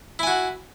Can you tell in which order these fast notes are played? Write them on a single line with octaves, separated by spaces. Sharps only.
E4 G#5 F#4